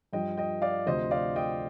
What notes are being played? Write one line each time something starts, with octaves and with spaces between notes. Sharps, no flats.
G2 F3 D#5 G5
D#5 G5
D5 F5
D2 C3 F3 C5 D#5
D5 F5
D#5 G5